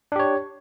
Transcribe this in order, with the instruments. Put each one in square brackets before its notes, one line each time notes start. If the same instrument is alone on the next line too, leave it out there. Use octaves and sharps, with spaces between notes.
[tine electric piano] D4
G4
C#5